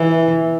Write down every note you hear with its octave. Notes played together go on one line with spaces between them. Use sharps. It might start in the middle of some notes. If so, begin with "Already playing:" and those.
Already playing: E3